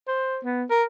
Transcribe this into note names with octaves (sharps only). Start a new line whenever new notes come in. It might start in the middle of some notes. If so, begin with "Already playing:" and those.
C5
B3
A#4